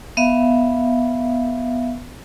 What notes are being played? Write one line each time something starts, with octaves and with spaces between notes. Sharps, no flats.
B3 E5 F5